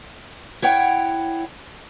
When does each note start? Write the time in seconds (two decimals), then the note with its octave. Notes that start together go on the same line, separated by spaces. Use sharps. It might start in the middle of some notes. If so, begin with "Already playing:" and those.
0.62 E4 C#5 F#5 G5